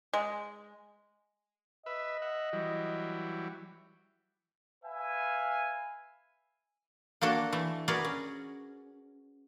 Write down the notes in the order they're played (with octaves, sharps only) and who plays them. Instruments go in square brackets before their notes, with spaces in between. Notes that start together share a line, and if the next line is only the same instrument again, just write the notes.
[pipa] G#3
[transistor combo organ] B4 E5 [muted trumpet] D#5
[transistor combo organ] E5 F#5
E3 F#3 G3
[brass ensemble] B4 E5 F5 G#5
[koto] A#3 D4 F#4 A4
E3 A3
F#4 G#4 A#4 B4 D5
C#4